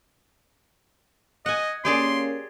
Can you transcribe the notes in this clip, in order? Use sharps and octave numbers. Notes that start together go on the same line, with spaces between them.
D#5 F#5 G#5
A#3 C#4 G4 G#4 D5 C6